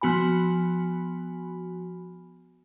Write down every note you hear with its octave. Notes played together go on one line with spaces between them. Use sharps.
F3 B3 F#4 G#5 B5